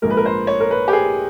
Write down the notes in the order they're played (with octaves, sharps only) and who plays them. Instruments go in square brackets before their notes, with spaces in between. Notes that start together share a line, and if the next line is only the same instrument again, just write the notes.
[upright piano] A#1 G#2 F3 G#3 A#4
B4
A#4
C5
C#5
A#4
B4
G4
G#4